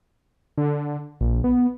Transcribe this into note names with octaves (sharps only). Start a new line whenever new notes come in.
D3
A#1
B3